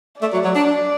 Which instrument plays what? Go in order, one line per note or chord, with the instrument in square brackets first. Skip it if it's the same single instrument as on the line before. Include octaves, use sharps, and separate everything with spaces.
[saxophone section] A3 [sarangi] D5
[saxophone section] F#3
F#3
D4
D4